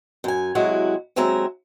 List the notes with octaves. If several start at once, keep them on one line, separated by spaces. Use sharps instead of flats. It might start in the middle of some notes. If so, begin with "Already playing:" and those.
F#2 G#5
C3 F#3 G#3 E4 F#4
D#2 F#3 G#3 C4 E5 A#5